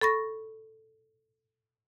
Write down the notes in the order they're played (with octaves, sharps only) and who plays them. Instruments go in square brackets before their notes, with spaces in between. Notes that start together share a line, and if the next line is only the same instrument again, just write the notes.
[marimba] A4 B5 C#6 A#6